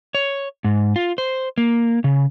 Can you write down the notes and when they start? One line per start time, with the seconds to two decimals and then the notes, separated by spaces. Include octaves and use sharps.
0.15 C#5
0.64 G#2
0.96 F4
1.18 C5
1.58 A#3
2.04 C#3